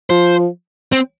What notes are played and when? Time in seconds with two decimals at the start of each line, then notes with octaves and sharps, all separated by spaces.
0.10 F3 C5
0.92 C4